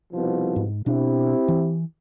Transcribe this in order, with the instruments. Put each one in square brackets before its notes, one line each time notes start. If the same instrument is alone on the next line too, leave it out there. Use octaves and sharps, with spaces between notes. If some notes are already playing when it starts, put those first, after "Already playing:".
[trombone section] C2 B2 F3
[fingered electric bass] G#2
[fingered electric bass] B2 D4 [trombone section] C4 E4 G4
[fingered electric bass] E3